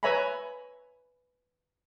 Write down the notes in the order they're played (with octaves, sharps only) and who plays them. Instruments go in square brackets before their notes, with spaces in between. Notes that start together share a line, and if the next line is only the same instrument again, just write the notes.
[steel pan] B4 C#5 E5 G#5 A#5 B5